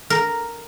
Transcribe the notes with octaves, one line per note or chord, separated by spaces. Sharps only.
A#4